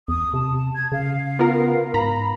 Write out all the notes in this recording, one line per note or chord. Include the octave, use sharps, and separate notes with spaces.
E2 D#6
C3 A5
G#6
C#3 F5
B3 F4 A#4
G#2 A#5 B5